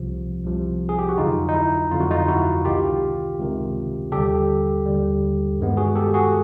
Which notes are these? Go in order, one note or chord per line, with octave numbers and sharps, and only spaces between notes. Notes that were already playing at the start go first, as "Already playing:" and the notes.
Already playing: C2 C3 F3
C2 C3 F3
G#4
G4
F#4
F2 D3 F#3 D#4 F4
D#4
E4
F2 D3 F#3 F4
F#4
D#4 F4
E4 F#4
C#2 C3 D#3 F4 G4
C#2 C3 D#3
D#2 D3 G3 G4 A4
D#2 D3 G3
G2 D#3 G#3 B3
F#4 G#4
G4 A4
F#4 G#4